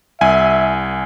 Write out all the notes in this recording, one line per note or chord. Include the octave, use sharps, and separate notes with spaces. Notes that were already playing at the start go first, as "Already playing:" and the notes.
C2 E5 G#5